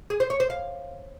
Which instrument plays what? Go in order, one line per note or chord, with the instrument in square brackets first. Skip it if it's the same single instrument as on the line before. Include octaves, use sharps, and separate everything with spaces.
[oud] G#4
C5
C#5
C5
F5